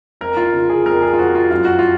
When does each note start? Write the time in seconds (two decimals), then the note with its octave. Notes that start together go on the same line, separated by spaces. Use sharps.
0.21 F2 A#4
0.37 F4
0.53 C#3
0.70 G#4
0.86 F2 A#4
1.02 G#4
1.14 F4
1.18 F2 F#4
1.35 F4
1.51 F#2 F4
1.65 F#4
1.79 F4